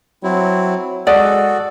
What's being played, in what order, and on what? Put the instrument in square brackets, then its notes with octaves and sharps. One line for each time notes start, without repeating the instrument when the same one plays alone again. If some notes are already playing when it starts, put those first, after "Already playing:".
[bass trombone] F#3 [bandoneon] C4 E4
[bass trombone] G#3 [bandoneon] F#4 A4 [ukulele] D5 [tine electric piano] F#5 D#6